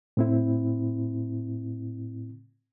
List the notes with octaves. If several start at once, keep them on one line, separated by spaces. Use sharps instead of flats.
A2 C4 E4